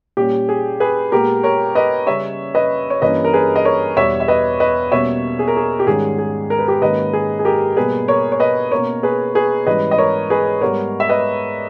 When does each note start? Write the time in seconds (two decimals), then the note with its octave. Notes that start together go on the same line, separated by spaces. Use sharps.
0.17 A#2 G3 C#4 G4
0.49 G#4
0.80 G#4 B4
1.12 A#2 G#3 B3 G4 A#4
1.43 A#4 C#5
1.75 B4 D#5
2.07 C#3 G3 C#4 C#5 E5
2.55 B4 D#5
2.90 C#5
3.02 G2 E3 G3 A#3 C#4 B4 D#5
3.24 A#4
3.33 G#4 B4
3.56 D#5
3.65 A#4 C#5
3.97 E2 B2 G3 C#5 E5
4.20 E5
4.28 B4 D#5
4.60 B4 D#5
4.92 B2 G3 A#3 C#4 C#5 E5
5.39 G#4
5.48 A#4
5.57 G#4
5.79 G4
5.86 G#2 D#3 G3 C#4 G#4
6.18 G#4
6.50 A#4
6.59 B4
6.68 G4 A#4
6.81 G#2 D#3 A#3 C#4 B4 D#5
7.13 G#4
7.39 G#4
7.45 G4 A#4
7.77 B2 G3 A#3 G#4 B4
8.08 A#4 C#5
8.32 C#5
8.40 B4 D#5
8.71 B2 A#3 C#4 A#4 C#5
9.03 G#4 B4
9.35 G#4 B4
9.66 G#2 E3 G3 C#4 B4 D#5
9.91 D#5
9.98 A#4 C#5
10.30 G#4 B4
10.61 G#2 G3 B3 A#4 C#5
11.00 E5
11.09 B4 D#5